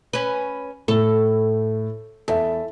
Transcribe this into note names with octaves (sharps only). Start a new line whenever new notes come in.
C#4 B4
A2 A4
E2 A4 E5